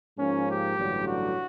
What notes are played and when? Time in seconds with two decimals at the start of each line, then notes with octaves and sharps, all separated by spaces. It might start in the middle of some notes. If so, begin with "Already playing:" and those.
0.18 G#2 F3 A#3 C#4
0.48 G4
0.77 A1 G2 D3 F#3
1.06 F#4